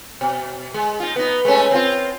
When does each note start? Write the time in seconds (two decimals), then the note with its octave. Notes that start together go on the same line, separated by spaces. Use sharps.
0.21 B2
0.74 G#3
1.00 D#4 F4
1.16 B3 D#4
1.45 G#3 A3 C#4
1.71 C4 F4